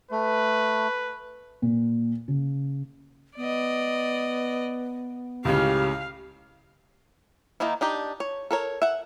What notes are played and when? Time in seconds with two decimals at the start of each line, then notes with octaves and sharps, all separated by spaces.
0.11 A3 B4
1.62 A#2
2.28 C#3
3.37 B3 D5 D#5
5.45 C#2 A2 C#3 G4 F5
7.60 D#3 A#3 D#4 E4
7.81 D4 D#4 G4
8.20 C#5
8.51 A4 A#4 C#5
8.82 E5 F#5